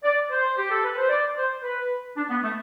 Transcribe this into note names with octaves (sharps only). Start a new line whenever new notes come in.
D5
C5
G4
A4
B4
C5
D5
C5
B4
D4
B3
A3